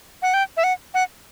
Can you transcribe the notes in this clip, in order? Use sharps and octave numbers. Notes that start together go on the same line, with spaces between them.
F#5
G5
E5
F#5
F#5